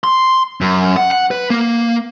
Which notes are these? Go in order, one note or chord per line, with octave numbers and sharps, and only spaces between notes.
C6
F#2
F#5
F#5
B4
A#3